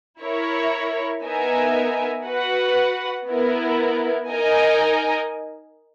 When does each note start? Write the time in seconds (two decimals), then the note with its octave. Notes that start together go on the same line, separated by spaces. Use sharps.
0.20 E4 A#4 C#5
1.23 B3 D#4 A#4 E5 G#5
2.25 F#4 B4 F#5
3.28 B3 E4 A#4
4.31 D#4 A#4 D#5 G#5